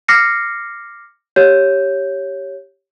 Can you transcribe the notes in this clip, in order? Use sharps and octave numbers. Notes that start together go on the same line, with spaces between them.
D6 F6 A#6 C7 C#7
G4 C#5 G6